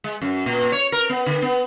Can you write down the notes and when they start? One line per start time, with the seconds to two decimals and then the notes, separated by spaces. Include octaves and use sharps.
0.04 G#3
0.22 F#2
0.46 A#2
0.72 C#5
0.92 A#4
1.10 B3
1.26 D3
1.42 B3